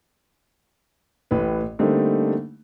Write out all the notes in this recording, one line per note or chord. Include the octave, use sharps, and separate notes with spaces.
A1 A2 B4
D3 G3 A3 A#3 C4 D#4